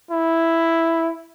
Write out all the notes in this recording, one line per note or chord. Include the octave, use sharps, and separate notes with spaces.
E4